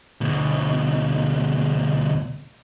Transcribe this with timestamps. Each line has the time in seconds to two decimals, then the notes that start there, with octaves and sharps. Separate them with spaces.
0.21 D2 B2